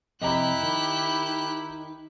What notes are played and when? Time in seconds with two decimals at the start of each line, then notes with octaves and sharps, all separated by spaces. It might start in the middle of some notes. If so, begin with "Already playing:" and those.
0.22 F2 C3 E4 G4 D#5 A#5 B5 F#6
0.63 D#3